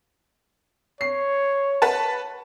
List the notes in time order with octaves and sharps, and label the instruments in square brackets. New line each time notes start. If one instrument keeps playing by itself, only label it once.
[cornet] C#5 [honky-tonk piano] C7
[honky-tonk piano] B4 F#5 A5